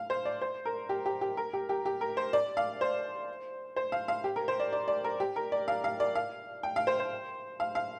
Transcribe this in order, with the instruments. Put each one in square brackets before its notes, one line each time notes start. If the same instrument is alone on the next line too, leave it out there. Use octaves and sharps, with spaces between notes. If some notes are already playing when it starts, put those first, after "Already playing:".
Already playing: [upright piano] F5
C5
D5
C5
A#4
G4
G4
G4
A#4
G4
G4
G4
A#4
C5
D5
F5
C5
C5
F5
F5
G4
A#4
C5
D5
D5
D5
A#4
G4
A#4
D5
F5
F5
D5
F5
G5
F5
C5
C5
F5
F5